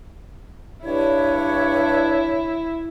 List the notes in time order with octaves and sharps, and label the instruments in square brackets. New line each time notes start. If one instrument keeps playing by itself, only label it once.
[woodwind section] G2 D4 C#5 [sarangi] E4